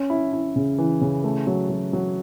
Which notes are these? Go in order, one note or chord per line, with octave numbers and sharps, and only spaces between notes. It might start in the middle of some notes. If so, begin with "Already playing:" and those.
Already playing: C#4
E4
E4
C#3
E3
C#3
A3
F#3
F#3
F#3